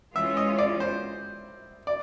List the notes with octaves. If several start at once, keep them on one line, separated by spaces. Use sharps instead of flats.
E3 G#3 C#4 F4 E5
D#5
D5
C5
D5